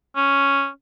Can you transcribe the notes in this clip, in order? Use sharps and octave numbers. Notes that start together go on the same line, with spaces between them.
C#4